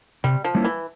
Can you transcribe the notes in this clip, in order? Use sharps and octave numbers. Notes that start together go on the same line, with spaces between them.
C3 G3
F3
G3 A#3 C#4 E4
E3